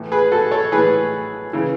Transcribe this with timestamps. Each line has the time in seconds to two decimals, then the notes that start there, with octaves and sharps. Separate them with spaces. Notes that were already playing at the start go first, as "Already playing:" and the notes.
Already playing: A2 E3
0.12 G#4 B4
0.32 F#4 A4
0.51 A4 C#5
0.72 A2 E3 G#4 B4
1.53 C#3 E3